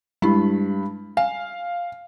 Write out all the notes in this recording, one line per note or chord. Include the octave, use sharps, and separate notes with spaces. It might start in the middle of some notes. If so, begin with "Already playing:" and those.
G2 G#3 E4 B5
F5 G#5